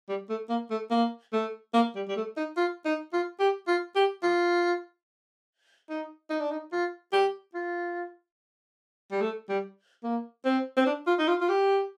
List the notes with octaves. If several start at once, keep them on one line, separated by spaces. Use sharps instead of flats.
G3
A3
A#3
A3
A#3
A3
A#3
G3
G3
A3
D#4
F4
D#4
F4
G4
F4
G4
F4
D#4
D#4
D4
D#4
F4
G4
F4
G3
A3
G3
A#3
C4
C4
D4
F4
D#4
F4
F4
G4